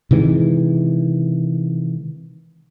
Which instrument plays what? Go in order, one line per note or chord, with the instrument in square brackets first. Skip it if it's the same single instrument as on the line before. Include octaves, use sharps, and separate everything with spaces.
[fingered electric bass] C3 D#3 E3 G#3